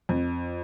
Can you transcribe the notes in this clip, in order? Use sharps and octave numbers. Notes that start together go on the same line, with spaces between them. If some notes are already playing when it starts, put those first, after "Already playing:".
F2